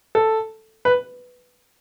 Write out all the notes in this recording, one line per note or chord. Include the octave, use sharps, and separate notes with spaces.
A4
B4